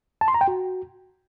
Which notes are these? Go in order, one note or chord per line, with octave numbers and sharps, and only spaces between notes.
A5
C6
A#5
G5
F#4